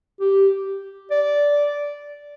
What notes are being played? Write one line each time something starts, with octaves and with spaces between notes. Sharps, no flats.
G4
D5